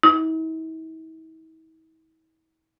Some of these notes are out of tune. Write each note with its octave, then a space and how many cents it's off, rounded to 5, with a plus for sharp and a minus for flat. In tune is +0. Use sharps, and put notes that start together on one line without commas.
E4 -45